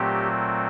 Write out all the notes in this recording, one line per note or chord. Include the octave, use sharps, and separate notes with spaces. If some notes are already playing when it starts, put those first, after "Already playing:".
Already playing: A#2 F#3 A3 C4 G4